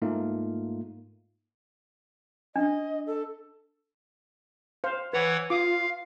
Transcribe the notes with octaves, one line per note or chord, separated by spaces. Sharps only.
G#2 A3 A#3 D#4 F4
D4 D#5
A4
C5 F5
E3 B4 C#5 F#5
F4 F5 D6 D#6